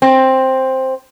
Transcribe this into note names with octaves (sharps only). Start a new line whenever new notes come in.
C4